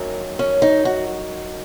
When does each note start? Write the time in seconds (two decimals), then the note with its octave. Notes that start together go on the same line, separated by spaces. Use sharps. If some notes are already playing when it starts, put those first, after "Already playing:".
Already playing: F#2 D#3 F#3 A#3
0.39 C#4
0.62 D#4
0.85 F#4